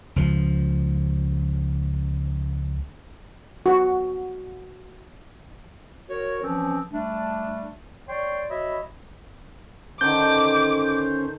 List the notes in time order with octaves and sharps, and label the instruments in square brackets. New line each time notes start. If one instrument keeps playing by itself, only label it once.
[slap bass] C#2 F3
[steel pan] F#4
[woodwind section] F#4 A#4 C#5
E3 F3 C4 C#4
G3 A3 D4
C#5 D5 G5 C6 C#6
F#4 C#5 D#5 E5 B5
[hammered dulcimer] D3 D#3 [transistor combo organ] C#4 C5 [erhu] D6 [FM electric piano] G6